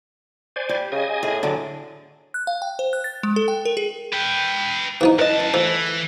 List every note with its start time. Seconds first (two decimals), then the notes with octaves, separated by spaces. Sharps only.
0.56 C5 D5 G#5
0.69 G3 G4
0.92 C#3 D#5 G#5
1.10 G#4
1.23 A2 G#4
1.43 D3 F#3 D5
2.34 F#6
2.47 F5
2.62 G5
2.79 C5
2.93 F#6
3.04 A6
3.23 G#3
3.36 A4
3.48 G5
3.65 A#4
3.77 G#4
4.12 B4 G5
5.01 E3 F3 D#4
5.19 F#2 B4 D#5 A5
5.54 E3 F3 A3